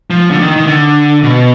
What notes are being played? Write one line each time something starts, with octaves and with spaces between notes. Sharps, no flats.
F3
D3
D#3
D#3
D3
B2